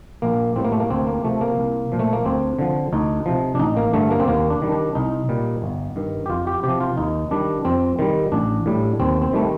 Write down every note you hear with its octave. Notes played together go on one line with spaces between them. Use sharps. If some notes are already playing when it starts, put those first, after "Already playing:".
A#1 A#3
A2 G3 C4
A#3
A3
A#3
D2 C4
A#3
C3 F3 A3
A#3
C2
A#2 F3
A3
A#3
D2 C4
D3 F3
D2 D#4
C3 F3
D4
A1 D#4
A#3
G2 D3 A3
A#3
C4
D#2 A#3
D4
D#3 G3
D4
C2 D#4
A#2 G3
G1
G2 D#3
G4
F2 F4
G4
C3 F3 G4
F4
D#2 D#4
D#3 G3 D4
F2 C4
D#3 G3
A1 D4
A2 G3
D#2 C4
C4
D#3 G3 A3